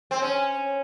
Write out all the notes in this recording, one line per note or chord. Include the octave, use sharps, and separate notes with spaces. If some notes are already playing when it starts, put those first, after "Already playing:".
C4
C#4